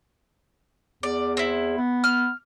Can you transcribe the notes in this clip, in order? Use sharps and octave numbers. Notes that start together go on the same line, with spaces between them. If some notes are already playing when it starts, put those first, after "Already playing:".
E2 D5
C4 E4
B3
F6